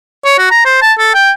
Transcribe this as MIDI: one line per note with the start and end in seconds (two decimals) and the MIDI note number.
0.25 0.38 73
0.38 0.49 66
0.51 0.62 82
0.65 0.79 72
0.82 0.93 81
0.99 1.13 69
1.14 1.31 79